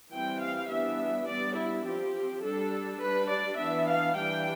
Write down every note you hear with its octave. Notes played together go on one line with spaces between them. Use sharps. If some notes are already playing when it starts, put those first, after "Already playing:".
E3 G3 C4 G5
F5
E3 G3 B3 D4 E5
G3 B3 D4 D5
E4
F3 C4 G4
G3 D4 A4
G3 D4 B4
D5
E3 B3 D4 E5
F5
E3 G3 D4 G5